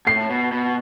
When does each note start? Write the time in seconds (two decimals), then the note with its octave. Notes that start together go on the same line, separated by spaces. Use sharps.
0.07 A2 C7
0.29 B2
0.52 B2